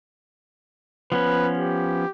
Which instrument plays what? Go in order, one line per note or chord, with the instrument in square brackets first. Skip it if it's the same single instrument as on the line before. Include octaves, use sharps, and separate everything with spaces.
[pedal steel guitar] F3 B3 C#4 [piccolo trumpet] B4
[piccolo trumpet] G4